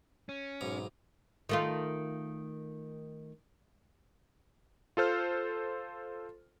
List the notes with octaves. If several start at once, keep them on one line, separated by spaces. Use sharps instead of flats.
C#4
B1 G#2 A#5
D#3 A3 F4
F4 A4 C5 F6